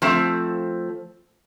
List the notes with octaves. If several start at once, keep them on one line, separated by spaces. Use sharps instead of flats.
F3 A3 C4